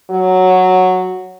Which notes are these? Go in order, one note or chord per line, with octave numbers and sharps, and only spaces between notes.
F#3